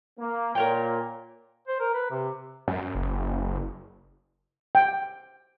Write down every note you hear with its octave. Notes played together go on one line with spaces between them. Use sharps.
A#3
A#2 A#4 C#5 G5
C5
A#4
B4
C3
F#2
F#1
G5